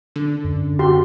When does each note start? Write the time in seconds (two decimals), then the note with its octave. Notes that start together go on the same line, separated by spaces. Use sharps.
0.16 D3
0.44 F#2
0.79 F#4 G4 C6